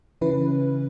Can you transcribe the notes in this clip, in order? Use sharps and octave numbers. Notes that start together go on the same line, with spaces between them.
C#3 E3 C#4 E4 B4